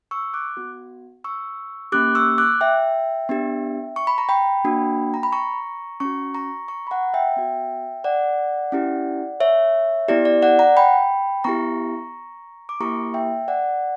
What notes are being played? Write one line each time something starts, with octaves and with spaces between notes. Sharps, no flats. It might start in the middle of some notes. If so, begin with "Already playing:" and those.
C#6 E6
D6 F#6
B3 F#4
C#6 E6
A#3 C#4 G4 D6 F#6
C#6 E6
D6 F#6
E5 G5
B3 D4 G4
C#6
B5
A#5
G5 B5
A#3 D4 F#4
A#5
B5
A#5 C#6
C#4 F#4 A#5 C#6
A#5 C#6
A#5 C#6
B5
F#5 A#5
E5 G5
B3 F#4
D5 F#5
C#4 E4 G4
C#5 E5
B3 E4 G4 D5
D5
D5 F#5
F#5 A#5
G5 B5
B3 E4 G4 A#5 C#6
D6
A#3 E4 G4 A#5 C#6
E5 G5
D5 F#5